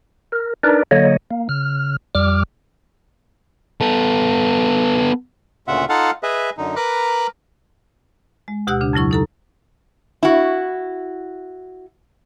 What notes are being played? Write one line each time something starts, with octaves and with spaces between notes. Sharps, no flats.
A#4
D4 D#4 A#4 B4 D5
D3 F#3 A#3 C#5 D#5
A#3
C#3 F6
F2 G3 D6 F6
B3 A4
D2 A#2 C#3 F4 E5 F#5
D#4 F4 A4 F5 F#5 A5
G#4 B4 D#5 E5
F#2 D3 D#4
A#4 B4 A#5 B5 D6 F#6
G#3
D2 B2 G4 F#5 E6 F#6
C#3 D4
F2 C#3 F#3 E4 C#6
D#4 A4 A#5
E4 F#4